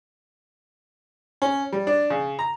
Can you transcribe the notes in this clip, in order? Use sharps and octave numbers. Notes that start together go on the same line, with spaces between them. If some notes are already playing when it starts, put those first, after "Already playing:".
C#4
G3
D4
C#3
A#5